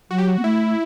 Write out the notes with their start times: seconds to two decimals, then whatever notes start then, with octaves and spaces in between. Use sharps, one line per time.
0.11 F#3 F#4
0.18 G4
0.27 F#4
0.39 B3
0.44 A3 E4